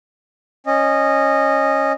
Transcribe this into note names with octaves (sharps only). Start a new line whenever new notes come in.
C#4 D#5